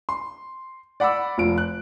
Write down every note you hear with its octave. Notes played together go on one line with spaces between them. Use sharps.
C6
D5 F#5 B5 D6 E6
F1 F3 D7
F#6